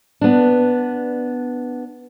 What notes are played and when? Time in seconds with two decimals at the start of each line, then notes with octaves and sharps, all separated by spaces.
0.21 B3 D4